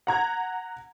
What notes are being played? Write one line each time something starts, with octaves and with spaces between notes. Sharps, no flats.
F#5 A#5 G#6